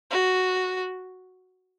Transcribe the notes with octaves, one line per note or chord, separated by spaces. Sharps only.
F#4